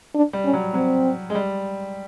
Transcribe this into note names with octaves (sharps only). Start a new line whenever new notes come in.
D4
G3
C#4
F#3
F#3 C4
G#3
G3